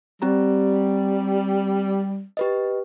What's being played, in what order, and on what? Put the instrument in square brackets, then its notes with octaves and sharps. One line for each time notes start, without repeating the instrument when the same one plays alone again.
[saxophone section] G3 [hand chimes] C4 G4 A#5
[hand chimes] G4 B4 D#5